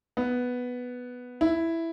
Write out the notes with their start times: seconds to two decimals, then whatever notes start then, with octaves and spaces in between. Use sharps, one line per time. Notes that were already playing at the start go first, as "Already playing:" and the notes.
0.17 B3
1.41 E4